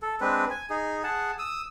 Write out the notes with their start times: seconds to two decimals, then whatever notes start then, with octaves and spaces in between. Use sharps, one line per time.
0.02 A4
0.21 G#3 C4 D4 B4
0.50 G#5
0.70 D#4 G#4
1.04 G#4 F#5 A5
1.39 D#6 E6